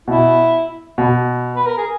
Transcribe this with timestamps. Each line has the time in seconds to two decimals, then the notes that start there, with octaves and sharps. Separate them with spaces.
0.08 B2 E4
0.98 B2
1.55 B4
1.66 A#4
1.77 G#4